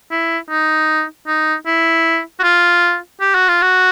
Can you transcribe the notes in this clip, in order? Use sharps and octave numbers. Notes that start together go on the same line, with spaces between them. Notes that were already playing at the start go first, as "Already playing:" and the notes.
E4
D#4
D#4
E4
F#4
F4
G4
F#4
F4
F#4